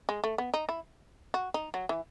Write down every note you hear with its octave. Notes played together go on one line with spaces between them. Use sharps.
G#3
A3
B3
D#4
E4
F#4
D#4
F#3
E3